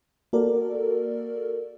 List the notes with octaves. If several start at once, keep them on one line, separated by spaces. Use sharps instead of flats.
A#3 F#4 A4 A#4 D5